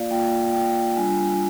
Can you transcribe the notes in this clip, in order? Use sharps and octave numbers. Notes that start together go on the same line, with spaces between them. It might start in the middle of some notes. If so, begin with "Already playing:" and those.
Already playing: A#3 F4 D5 F5
A#3 F4 G5
G5
G3 D4 F4 G#5